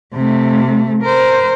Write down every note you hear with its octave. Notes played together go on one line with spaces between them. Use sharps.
C3 A3
A#4 C5